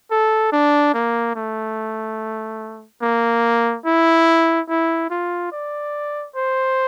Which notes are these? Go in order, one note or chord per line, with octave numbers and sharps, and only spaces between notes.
A4
D4
A#3
A3
A#3
E4
E4
F4
D5
C5